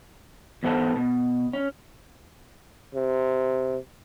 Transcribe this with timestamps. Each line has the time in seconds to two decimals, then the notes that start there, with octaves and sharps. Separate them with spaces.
0.63 E2 G#2 B3 A4 C5 A5
0.96 B2
1.53 C#4
2.94 C3